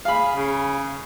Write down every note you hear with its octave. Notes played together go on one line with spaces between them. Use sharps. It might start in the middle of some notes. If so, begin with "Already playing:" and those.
G#4 F5 B5
C#3